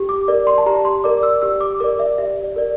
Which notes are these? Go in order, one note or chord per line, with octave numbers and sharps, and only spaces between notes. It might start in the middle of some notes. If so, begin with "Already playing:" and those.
Already playing: G4
D6
A#4 D5
C6
A5
G4 A#5
C6
A#4 D5 D6
E6
G4 E6
D6
A#4 D5 D6
E5
G4 E5
D5
A#4 D5